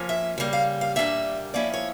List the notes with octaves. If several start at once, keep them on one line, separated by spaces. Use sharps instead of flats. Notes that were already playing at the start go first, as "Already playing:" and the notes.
Already playing: F3 A#3 C#4
E5
C#3 G3 A#3
F5
F5
A#2 G3 A#3 D4 E5
F3 A#3 C#4 E4 D5
C#5